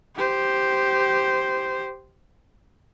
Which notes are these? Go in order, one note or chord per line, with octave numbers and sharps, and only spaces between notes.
G4 C5